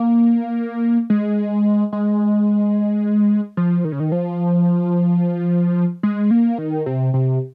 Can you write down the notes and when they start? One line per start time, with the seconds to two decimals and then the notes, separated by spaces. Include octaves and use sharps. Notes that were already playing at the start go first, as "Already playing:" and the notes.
Already playing: A#3
1.10 G#3
1.93 G#3
3.57 F3
3.85 D#3
3.92 C#3
4.00 D#3
4.12 F3
6.03 G#3
6.31 A#3
6.58 D#3
6.86 C3
7.14 C3